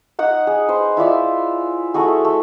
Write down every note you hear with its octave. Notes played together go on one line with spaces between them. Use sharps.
D#4 F#5 D#6
G#4
B4 C5
E4 F4 D5 E5
A3 E4 F#4 G#4
A3